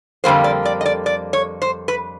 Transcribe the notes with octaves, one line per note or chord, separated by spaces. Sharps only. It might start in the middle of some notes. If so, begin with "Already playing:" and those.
F2 D3 G3 A#3 C5
D5
D5
D#5
D5
D5
C#5
C5
B4